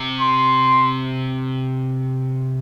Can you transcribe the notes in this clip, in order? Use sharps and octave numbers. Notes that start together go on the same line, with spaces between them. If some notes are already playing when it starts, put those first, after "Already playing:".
Already playing: C3
C6